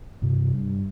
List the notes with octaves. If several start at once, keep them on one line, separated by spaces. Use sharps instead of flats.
G2 C3
G2